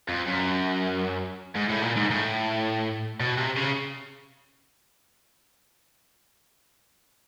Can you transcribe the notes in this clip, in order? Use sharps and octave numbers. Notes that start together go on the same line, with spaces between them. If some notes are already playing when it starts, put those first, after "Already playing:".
F2
F#2
G#2
A2
A#2
G#2
A2
B2
C3
C#3